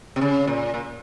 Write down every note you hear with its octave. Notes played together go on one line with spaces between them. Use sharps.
C3
C#3
A#2
A#2